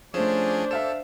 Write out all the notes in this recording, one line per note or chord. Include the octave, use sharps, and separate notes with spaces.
F3 A3 C#4 D4 G#4 C5 E7
A4 E5 F5 E7